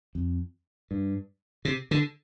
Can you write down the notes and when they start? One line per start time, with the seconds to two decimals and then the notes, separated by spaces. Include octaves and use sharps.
0.15 F2
0.91 G2
1.65 C3
1.91 D3